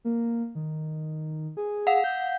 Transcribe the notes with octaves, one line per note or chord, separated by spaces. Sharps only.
A#3
D#3
G#4
F5 F#5
G6